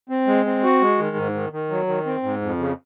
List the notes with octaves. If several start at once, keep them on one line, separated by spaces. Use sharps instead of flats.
C4
G#3
C4
F#4
G#3
D#3
G#2
D#3
D#3
F#3
D#3
C4
G#2
F2
C#3